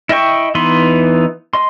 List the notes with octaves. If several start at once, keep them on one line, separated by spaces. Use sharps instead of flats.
E4 D#5 E5 G5 C#6
E3 B3 D#4 B5 C6
D#5 C6